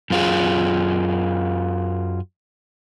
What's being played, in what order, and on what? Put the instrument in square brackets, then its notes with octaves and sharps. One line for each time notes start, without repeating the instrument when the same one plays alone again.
[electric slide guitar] F#2 F4 G#4